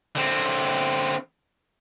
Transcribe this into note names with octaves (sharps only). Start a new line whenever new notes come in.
D3 C4